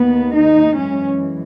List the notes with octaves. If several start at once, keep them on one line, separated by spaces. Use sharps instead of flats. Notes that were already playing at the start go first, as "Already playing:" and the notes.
Already playing: D#2 D#3 A#3 B3
D#4
F#2 E3 G#3 C#4